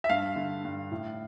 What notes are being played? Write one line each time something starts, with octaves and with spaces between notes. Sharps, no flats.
E5
G2 F5
D3
G2
A2